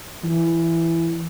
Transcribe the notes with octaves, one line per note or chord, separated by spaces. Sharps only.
E3